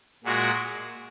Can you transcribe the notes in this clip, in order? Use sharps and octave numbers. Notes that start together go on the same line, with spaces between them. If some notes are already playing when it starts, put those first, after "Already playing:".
A#2 G#3 F#4 A#4